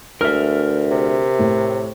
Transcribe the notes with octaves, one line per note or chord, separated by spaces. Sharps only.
D2 A#4 E5 F6
C3
A2